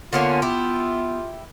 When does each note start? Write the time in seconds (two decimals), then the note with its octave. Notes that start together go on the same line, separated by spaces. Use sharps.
0.13 D3 A#3 B3 C#4 F4
0.42 E4 G4